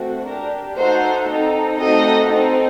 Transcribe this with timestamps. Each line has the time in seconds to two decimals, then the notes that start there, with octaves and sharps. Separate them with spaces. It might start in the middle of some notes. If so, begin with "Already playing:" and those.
Already playing: A3 C4 F#4
0.25 D4 G4 A#4
0.76 A3 D#4 F#4 A4 C5
1.28 C4 D#4 A4
1.79 A3 C4 D#4 F#4 A4 D#5
2.30 C4 D#4 A4